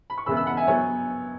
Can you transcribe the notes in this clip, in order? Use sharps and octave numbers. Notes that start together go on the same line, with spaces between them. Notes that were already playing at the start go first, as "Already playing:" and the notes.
B5
C#6
E1 E2 C#3 E3 B3 B5 E6
B5 E6
F#5 B5
E5 G#5
F#3 B3 G#4 C#5